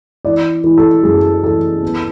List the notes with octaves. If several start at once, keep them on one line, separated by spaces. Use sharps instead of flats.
E3 D5
E3
A4
F#2 G#4
E3 A4
B3